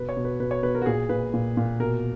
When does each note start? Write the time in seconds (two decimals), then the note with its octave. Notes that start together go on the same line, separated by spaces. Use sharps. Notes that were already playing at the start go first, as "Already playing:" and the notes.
Already playing: B2 B4
0.09 C#5
0.17 B2
0.25 B4
0.40 B2 B4
0.51 C#5
0.63 B2 B4
0.75 A#4
0.82 F#4
0.86 A#2 G#4
1.09 A#2 B4
1.34 A#2
1.57 A#2
1.80 B2 A#4